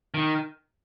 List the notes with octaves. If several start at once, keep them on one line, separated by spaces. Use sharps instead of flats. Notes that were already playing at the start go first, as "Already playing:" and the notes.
D#3